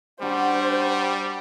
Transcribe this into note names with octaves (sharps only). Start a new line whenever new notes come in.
G3 D4 F#4 C5